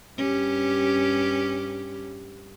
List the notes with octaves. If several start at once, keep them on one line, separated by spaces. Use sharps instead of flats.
G2 C#4 G4